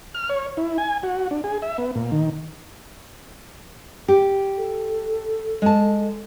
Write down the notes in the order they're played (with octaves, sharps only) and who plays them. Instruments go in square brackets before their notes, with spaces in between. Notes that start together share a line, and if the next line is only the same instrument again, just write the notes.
[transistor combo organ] F6
C#5
E4
G#5
F#4
D4
G#4
E5
B3
A#2
D#3
[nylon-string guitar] G4
[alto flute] A4
[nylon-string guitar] G#3 A5